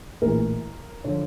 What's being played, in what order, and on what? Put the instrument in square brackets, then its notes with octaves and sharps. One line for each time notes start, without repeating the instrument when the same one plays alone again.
[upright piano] A#1 A2 E3 A#4
D3 F3 C#5